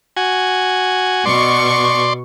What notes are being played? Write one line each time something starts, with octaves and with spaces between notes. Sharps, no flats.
F#4 G#5
B2 D5 C6 C#6